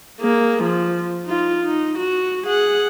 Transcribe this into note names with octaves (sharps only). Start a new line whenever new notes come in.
A#3 G#4
F3
D#4 F4
D#4
F#4
G#4 F#5